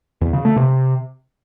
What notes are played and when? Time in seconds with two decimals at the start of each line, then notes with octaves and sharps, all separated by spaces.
0.21 E2
0.33 C#3
0.45 A3
0.56 C3